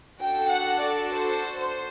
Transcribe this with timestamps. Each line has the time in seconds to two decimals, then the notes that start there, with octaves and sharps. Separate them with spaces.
0.20 D4 F#4 A4 G5
0.52 F#5
0.82 D5
1.13 C5
1.60 C5